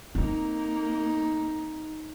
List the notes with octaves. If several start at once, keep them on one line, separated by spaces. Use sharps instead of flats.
A#3 C4 D#4